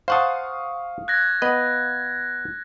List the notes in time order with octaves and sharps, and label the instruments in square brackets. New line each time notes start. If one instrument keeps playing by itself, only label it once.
[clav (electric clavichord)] C5 F#5 A5 [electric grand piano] F5 C#6 D#6
[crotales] F#6 G#6 A#6
[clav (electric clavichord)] B3 B4 D#5